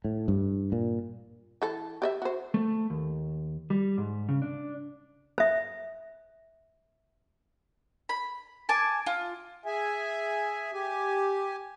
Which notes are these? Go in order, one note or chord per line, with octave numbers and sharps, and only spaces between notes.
A2
G2
A#2
E3 A4
G4 D#5 E5
F#4 C5
A3
D#2
G3
G#2
C#3
D4
C5 E5
B5
G#5 A5 D6
F4
G#4 E5 G#5
G4 G#5